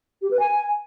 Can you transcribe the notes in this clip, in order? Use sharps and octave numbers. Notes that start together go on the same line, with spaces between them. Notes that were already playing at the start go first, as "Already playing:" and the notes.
G4
B4
G#5